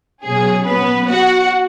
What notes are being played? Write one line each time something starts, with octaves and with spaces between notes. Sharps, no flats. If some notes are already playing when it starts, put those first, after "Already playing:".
B2 F#3 C#4 G#4
B3 B4
F#4 F#5